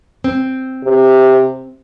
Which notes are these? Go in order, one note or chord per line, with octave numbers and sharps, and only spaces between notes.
C4
C3